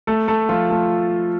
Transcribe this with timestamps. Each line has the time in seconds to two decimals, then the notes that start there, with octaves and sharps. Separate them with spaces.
0.07 A3 A4
0.28 A3 A4
0.49 F3 F4
0.70 A3 A4